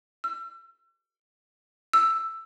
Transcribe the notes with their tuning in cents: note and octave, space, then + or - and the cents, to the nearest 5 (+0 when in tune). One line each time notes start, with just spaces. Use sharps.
E6 +40
E6 +5